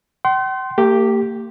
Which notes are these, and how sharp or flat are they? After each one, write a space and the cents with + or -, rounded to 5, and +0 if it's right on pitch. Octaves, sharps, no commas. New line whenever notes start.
G5 -45 C6 +0
A#3 -45 G4 +0